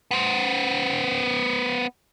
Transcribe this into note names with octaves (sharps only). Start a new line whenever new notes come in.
B3 C5